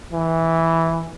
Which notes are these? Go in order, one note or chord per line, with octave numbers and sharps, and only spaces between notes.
E3